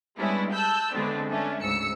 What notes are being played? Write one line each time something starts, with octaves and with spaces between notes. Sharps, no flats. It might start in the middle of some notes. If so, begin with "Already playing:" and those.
G3 G#3 B3 C#4 D4 E4
A5 E6 F#6 G6
D3 G#3 A3 B3 C4 D4
A3 C#4 D4
D2 G#2 C#3 E6 C#7